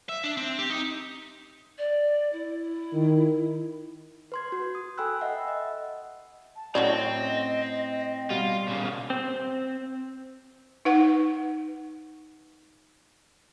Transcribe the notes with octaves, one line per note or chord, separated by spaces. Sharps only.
E5
D4
C4
G4
D#4
D5
E4
D#3
B4 C6 G#6
F#4
D#6
A4 G5 G#5 B5 E6 F#6
D#5 E5 F#5
D#5
A5
A2 F#3 C4 C#4 D5 D#5 A5
B2 G3 B3 F4
A#2 C#3
C4
D#4 B4 F#5